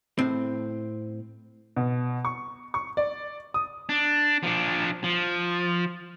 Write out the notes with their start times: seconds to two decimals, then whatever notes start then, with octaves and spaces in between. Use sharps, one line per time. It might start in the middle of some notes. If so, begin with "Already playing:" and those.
0.19 A2 C4
1.76 B2
2.25 C#6
2.74 C#6
2.97 D5
3.54 D#6
3.89 D4
4.43 F3 D4
5.04 F3